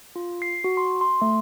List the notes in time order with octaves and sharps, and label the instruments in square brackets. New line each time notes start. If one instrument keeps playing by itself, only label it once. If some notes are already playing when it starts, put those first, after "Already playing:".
[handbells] F4
C7
F#4
C6
C6
A3